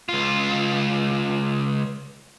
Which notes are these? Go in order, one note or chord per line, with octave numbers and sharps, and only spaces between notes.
C#2 F4